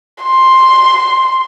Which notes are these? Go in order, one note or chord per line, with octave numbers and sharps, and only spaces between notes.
C6